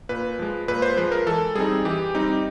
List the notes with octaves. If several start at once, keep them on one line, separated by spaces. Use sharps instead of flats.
A#2 B4
F3 G#3
A#2 B4
C5
F3 G#3 B4
A#4
E3 A4
G3 C4 D#4 G#4
E3 G4
G3 C4 D#4